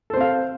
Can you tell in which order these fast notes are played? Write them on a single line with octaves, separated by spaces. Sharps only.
A4 C5 C4 F5